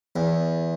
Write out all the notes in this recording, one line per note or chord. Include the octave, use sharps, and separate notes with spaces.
E2